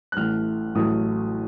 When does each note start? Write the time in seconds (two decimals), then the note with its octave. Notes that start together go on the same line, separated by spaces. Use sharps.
0.12 F#6
0.17 A1 A2 A3 F6
0.75 A1 A2 F#3 A3 D#6